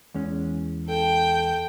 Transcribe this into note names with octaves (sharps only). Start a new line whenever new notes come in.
E2 G#3 C#4
A4 G5